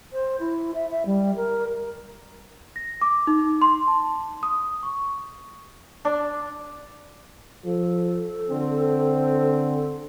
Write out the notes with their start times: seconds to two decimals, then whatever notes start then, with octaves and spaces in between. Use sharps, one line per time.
0.12 C5
0.39 E4
0.74 E5
0.91 E5
1.05 G3
1.36 A#4
2.76 A#6
3.02 D6
3.27 D#4
3.62 C6
3.88 A5
4.43 D#6
4.83 C#6
6.05 D4
7.65 F3 A4
8.50 D3 C4